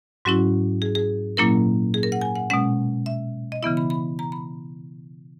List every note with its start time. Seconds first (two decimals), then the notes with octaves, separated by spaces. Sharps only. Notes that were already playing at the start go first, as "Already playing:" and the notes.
0.25 G#2 F#3 C#4 E4 F#4
0.82 G#4
0.95 G#4
1.37 A#2 F#3 A#3 C#4 E4 A#4
1.94 G#4
2.03 A#4
2.12 F#5
2.21 G#5
2.36 F#5
2.50 B2 G#3 C#4 F#5
3.06 E5
3.52 D#5
3.63 C#3 E3 B3 E4 E5
3.77 B5
3.90 B5
4.19 A#5
4.32 B5